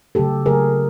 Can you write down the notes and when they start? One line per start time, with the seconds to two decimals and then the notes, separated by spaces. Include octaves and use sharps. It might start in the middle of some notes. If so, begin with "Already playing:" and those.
0.15 C#3 F#3 A3 G4 A4
0.45 C#3 F#3 A3 G#4 A#4